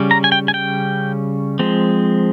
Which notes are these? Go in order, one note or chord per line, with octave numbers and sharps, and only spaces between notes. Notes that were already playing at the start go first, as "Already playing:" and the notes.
Already playing: C#3 G3 C#4
A#5
G#5
G5
G#5
G5
F3 G#3 C4